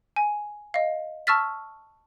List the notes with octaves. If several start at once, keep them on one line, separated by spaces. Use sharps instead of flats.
G#5
D#5 F5
A5 C#6 E6 F6 A6 B6